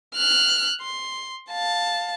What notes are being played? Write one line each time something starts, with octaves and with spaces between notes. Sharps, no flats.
F6 F#6
C6
F5 A5